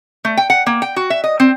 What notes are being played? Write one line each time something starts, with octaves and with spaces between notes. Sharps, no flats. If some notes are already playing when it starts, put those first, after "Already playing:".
A3
G5
F#5
A#3
G5
F#4
E5
D#5
C4